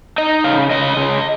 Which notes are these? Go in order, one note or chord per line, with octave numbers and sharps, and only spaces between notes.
D#4 D#5
C#3 F5
C#3 D#5
C#3